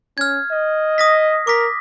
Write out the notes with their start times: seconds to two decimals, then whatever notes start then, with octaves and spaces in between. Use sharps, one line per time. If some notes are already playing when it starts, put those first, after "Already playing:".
0.18 C#4 F6 G#6
0.51 D#5
0.98 D#6 A#6 B6
1.47 A#4 D6 B6